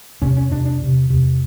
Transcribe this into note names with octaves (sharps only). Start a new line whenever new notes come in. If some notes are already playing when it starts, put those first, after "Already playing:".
E2 C3 C#4
C#4
E2 C3 D4
D4
E2 C3
E2 C3